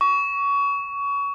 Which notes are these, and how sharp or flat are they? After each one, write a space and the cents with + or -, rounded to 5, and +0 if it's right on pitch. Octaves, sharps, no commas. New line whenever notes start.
C#6 +25